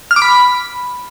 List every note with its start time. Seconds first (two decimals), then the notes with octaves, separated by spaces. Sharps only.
0.11 F6
0.16 D6
0.22 B5